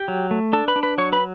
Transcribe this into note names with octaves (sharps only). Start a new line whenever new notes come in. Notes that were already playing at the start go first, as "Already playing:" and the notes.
Already playing: G4 G5
F#3
A3
D4 A4 A5
B4 B5
D4
B4 B5
F#3 C#5 C#6
B4 B5